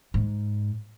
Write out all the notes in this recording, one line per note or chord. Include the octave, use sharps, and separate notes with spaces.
G#2